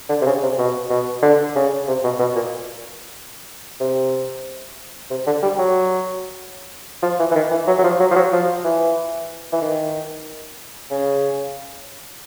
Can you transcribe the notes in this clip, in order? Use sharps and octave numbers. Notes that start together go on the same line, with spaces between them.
D3
C3
C#3
C3
B2
B2
D3
C#3
C3
B2
B2
A#2
C3
C3
D3
G3
F#3
F3
E3
E3
D#3
E3
F#3
F#3
F3
F#3
F3
F#3
F3
E3
E3
D#3
C#3